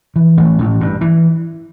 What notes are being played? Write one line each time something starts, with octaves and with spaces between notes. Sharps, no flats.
E3
A1
A1
G2
E3